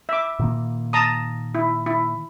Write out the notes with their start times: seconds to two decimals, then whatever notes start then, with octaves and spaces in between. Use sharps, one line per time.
0.09 E5 D6
0.39 A#2 D#3 A#3
0.93 A5 A#5 D#6
1.55 E4
1.86 E4